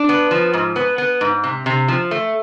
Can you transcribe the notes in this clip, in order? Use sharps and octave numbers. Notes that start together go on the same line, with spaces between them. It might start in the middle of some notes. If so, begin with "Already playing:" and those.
Already playing: D4
B3
F3
G#2
B3
B3
G#2
C3
C3
F3
A3